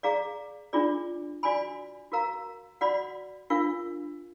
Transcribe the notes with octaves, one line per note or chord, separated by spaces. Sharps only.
G#4 D5 F5 A#5
D4 F4 G#4 D5
F#4 D5 G#5 B5
F#4 A#4 F5 A#5
F#4 D5 F#5 B5
D4 F4 A#4 F5